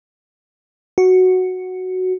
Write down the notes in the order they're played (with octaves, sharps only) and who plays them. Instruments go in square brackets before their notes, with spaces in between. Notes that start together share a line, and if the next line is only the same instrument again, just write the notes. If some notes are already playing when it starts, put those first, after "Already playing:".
[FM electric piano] F#4